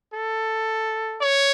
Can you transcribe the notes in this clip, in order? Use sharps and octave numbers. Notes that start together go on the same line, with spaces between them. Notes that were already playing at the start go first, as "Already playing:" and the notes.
A4
C#5